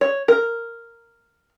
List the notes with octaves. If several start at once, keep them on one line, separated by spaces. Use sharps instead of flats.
C#5
A#4